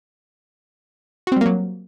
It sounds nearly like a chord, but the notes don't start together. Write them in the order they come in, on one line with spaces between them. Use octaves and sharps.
F#4 C4 G3 A#3 F#3